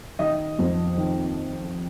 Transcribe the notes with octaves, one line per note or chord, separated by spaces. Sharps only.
D#3 D#5
F2
D#3